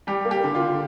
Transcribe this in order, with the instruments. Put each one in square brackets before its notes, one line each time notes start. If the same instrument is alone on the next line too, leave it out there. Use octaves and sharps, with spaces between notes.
[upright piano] G3 G4
A#3
G4
D3
F4
D3